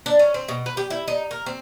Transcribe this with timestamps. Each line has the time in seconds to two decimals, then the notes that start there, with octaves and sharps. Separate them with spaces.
0.06 D4
0.19 C#4
0.34 C4
0.48 B2
0.66 B4
0.77 G4
0.90 E4
1.08 D#4
1.31 A#4
1.46 C4